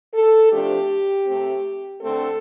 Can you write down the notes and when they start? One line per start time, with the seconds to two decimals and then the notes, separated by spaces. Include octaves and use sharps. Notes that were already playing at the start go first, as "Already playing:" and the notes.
0.14 A4
0.52 C3 F3 A3 D4 G4
1.27 C3 A3 C4
2.01 D3 A3 C4 A4